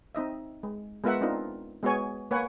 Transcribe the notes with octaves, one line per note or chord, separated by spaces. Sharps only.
C4 D#4 D#5 E5
G#3
G#3 B3 F4 A#4 E5 F#5
C4 D4 D#4 F4 A#4 D#5
G#3 B3 F#4 G#4 C#5 G#5
A#3 B4 C#5 F#5 G#5